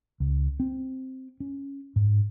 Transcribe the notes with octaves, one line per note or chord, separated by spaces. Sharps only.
C#2
C4
C#4
G#2